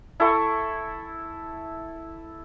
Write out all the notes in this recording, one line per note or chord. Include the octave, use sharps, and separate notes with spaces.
E4 A4 C#6